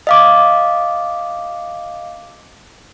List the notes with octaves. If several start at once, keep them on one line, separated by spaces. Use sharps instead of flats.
D#5 F5 D6